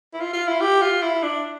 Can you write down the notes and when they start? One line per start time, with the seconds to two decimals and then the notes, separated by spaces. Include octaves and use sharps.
0.14 E4
0.20 F4
0.33 F4
0.48 E4
0.61 G4
0.82 F4
1.02 E4
1.23 D4